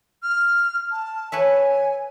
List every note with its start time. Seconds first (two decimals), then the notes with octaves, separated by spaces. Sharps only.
0.23 F6
0.91 A5
1.32 B4 C#5 E5 G#5